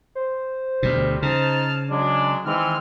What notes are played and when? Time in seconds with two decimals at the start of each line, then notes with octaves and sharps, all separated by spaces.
0.15 C5
0.83 D2 B2 G3
1.22 C#3 D#4 A5 F6
1.90 F#3 G#3 D4
2.45 D#3 E3 G#3 C4 F6